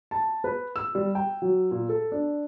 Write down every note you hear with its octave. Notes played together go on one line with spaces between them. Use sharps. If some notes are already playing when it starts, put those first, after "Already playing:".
A5
B4
E6
G3
G5
F#3
A#2
A4
D4